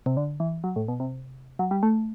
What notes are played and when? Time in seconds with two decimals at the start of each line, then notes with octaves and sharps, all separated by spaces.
0.06 C3
0.17 D3
0.40 E3
0.64 F#3
0.76 A2
0.88 B2
1.00 C3
1.59 F#3
1.71 G3
1.83 A3